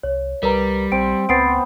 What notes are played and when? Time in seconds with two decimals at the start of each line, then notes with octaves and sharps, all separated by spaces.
0.03 C2 C#5
0.43 C2 G3 A#4 B4 A#5
0.92 A#1 C4 D7
1.29 C#2 B3 C4 A6 C7 D7